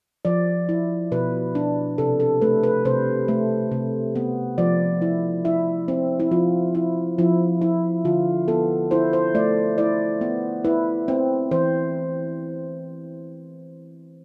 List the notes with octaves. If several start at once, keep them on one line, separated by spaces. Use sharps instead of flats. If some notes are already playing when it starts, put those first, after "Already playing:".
F3 D5
E4
B2 B4
D4
C3 A4
A4
A3 B4
B4
C3 C5
A3
C3
B3
F3 D5
E4
E4 E5
C4
E4
F3 F4
E4
F3 E4
E4
D3 F4
B3 A4
E4 C5
C5
A3 D5
E4 D5
B3
E4 B4
C4
E3 C5